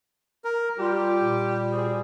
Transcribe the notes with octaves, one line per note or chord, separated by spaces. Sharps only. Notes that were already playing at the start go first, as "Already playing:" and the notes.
A#4
G3 F4 G4
A#2
C4 F#4 G#4